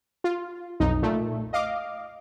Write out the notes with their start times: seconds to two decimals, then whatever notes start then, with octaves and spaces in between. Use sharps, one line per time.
0.24 F4
0.80 B1 F2 D#4
1.02 A#2 A3
1.53 D#5 F5 D6